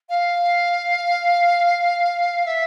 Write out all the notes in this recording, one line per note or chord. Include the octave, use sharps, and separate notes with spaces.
F5
E5